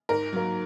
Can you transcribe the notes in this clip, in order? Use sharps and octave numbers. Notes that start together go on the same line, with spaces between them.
G#2 A#4
F#3 A#3